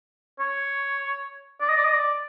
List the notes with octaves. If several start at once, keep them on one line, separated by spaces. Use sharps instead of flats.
C#5
D5
D#5
D5
D#5
D5